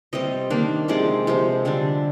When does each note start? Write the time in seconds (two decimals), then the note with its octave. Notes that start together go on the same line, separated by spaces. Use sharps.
0.13 C3 G3 C4 D#5
0.50 D#3 A#3 D4
0.88 C3 F3 G#3 C4 D5
1.27 C3 F3 C4
1.65 D3 G3 D4